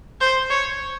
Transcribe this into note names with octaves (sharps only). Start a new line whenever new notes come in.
C5
C#5